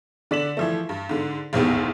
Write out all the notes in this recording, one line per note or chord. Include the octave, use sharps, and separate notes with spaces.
D3 D5 B6 E7 F#7
E3 F3 A3
G2
G#2 D3
F1 A#1 E2 G#2 B3 G4